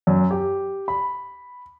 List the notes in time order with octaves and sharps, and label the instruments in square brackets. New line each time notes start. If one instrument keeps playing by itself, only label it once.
[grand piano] F#2
G4
B5